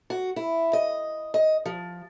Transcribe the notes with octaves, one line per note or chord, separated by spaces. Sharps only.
F#4
E4
D#5
D#5
F3